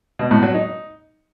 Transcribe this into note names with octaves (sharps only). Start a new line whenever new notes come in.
B2
A2
F#3
D#4